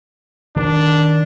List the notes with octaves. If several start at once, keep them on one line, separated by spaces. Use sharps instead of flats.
D#3 D4